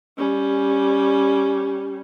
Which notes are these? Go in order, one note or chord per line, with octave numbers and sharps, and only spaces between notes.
G3 C#4